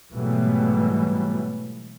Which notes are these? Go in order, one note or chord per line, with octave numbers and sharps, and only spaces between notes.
G#2 B2 E3 F#3 G3 A3